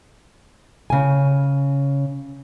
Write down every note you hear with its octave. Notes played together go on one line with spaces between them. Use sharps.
C#3 G#5